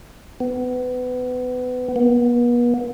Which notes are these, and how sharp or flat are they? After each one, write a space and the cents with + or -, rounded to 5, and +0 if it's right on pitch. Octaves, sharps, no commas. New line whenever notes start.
B3 +25
B3 -40